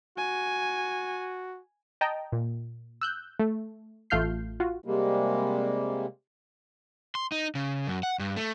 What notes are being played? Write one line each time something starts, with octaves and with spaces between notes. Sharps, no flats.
F#4 G#5
D#5 G5 A5 A#5
A#2
E6 F#6 G6
A3
A1 A3 F4 F6 G6 C7
F4 F#4
C3 G3 G#3 A#3
C6
D#4
C#3
F#2
F#5
G2
A3